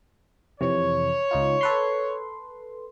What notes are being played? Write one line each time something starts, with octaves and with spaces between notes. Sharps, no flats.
F2 C3 E3 C#5
C#2 D#4 F4
A4 B4 C6